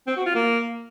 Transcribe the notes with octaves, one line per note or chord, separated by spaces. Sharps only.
C4
F#4
F4
A#3